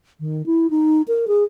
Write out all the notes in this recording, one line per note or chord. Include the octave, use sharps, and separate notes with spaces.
D#3
E4
D#4
A#4
G#4